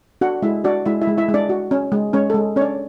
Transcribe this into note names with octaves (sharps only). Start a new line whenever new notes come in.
D4 F#4 F#5
G#3 E4 E5
D4 F#4 D5
G#3 E4 E5
E4 E5
G#3
E4 E5
G#3
D4 D5
F#4
C#4
G#3
G#3 C#4 C#5
G#3 A4
C#4 D4 C#5 D5